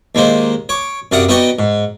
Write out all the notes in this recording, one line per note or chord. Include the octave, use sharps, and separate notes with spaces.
D#2 G#3 A#3 D#4 C5
C#5 D6
F#2 C3 D5 F5 F#5 D#6
B3 D#4 F#4 D5 D#5 G5
G#2